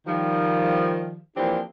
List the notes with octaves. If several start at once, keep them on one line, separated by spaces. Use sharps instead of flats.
D#3 F3 G3
E3 F3 A#3 C4 D4 G4